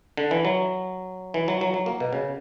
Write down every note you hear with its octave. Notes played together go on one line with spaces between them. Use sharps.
D3
E3
F#3
E3
F#3
F#3
F#3
A#3
B2
C#3